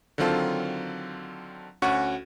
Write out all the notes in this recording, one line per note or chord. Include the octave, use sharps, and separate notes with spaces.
D3 D#3 F#3 C4 F4 A4
D2 C#4 F#4 F#5 C#6